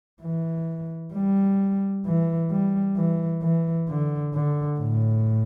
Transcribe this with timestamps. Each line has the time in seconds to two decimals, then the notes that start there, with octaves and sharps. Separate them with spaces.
0.23 E3
1.14 G3
2.06 E3
2.51 G3
2.97 E3
3.42 E3
3.89 D3
4.34 D3
4.79 A2